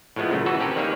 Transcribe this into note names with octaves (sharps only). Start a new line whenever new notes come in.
A2 F3 G#3 A3 B3
A#2 C#3 F#3 A3
E3 F#4 A4 B4
C4 C#4 G4 A#4 B4
D#3 G3 A#3 B4 C#5